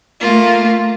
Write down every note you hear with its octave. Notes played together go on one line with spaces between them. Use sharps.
A3 A#3 F4